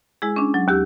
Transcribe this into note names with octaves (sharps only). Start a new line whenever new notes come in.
G#3 E4 G#4
C#4 D4
F#3
D#2 G4 E6